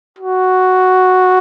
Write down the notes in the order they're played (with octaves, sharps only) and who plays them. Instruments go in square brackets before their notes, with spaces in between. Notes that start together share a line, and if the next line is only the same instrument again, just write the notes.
[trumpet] F#4